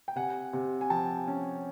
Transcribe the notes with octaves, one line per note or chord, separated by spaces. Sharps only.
G5
C3 F#5 G#5
C3
G#5
F3 G5 A5
C#4